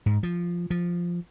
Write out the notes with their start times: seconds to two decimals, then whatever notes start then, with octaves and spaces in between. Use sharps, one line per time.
0.06 G#2
0.23 F3
0.70 F3